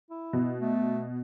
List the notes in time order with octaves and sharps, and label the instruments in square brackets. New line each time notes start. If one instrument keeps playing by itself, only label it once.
[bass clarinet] E4
[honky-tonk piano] B2
[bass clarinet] A3